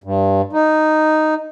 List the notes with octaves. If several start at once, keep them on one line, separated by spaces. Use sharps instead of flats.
G2
D#4